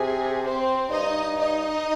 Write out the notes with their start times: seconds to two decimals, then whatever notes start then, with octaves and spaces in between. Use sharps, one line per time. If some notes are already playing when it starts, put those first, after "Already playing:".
Already playing: C3 G#4
0.43 C4 C5
0.90 G2 D#4 D#5
1.37 D#4 D#5